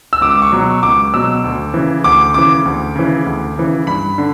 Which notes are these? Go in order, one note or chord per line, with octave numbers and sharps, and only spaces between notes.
E6
C#2 D6
D6
C#6
B2 F#3
C#6
C#2 D6
B2 F#3 E6
D2
C#3 E3
D2 D6
C#3 E3 D6
D2
C#3 E3
D2
C#3 E3
G2 B5
D3